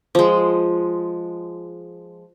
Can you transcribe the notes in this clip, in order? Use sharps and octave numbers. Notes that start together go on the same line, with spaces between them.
F3 G#3